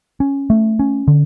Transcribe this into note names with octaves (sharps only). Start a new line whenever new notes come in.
C#4
A3
C#4
D3